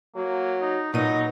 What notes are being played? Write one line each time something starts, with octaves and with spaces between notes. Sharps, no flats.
F#3 A#3
D#4
A#2 F#3 B3 D#4 D#7